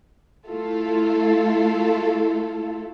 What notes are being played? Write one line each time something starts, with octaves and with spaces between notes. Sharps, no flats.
A3 E4 F4 A4